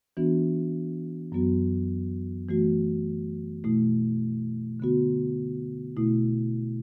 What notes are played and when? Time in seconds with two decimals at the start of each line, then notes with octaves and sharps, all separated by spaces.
0.17 E3 B3 D4 F#4
1.32 F#2 F#3 B3 F#4
2.48 E3 A3 F#4
3.64 B2 A3 E4
4.80 D3 B3 F#4
5.97 B2 A3 E4